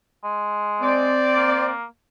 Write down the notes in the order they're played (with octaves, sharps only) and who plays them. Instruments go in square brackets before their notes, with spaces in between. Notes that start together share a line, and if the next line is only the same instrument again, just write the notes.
[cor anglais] G#3
[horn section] C4 D5
[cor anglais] A#3